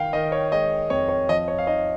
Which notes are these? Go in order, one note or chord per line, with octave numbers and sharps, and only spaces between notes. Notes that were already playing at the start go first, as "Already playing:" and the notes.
Already playing: D#3 F5 G5
D#3 D#5
C#5
G#3 D#5
F2 C#5
C#5
F3 D#5
C#5
F5
D#4 D#5